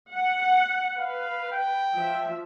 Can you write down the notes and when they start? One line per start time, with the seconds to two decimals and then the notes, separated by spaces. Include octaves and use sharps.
0.11 F#5
0.99 B4 F5
1.52 G5
1.96 F3 E5